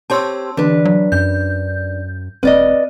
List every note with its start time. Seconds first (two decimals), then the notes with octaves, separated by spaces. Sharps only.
0.10 C4 G4 C#5 A5 C6 E6
0.57 D3 E3 D4 B4
0.85 F#3
1.12 F#2 G6
2.43 E1 C4 B4 D5 D#5